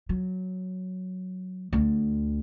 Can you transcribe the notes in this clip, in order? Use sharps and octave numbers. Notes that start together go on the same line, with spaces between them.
F#3
D2 D3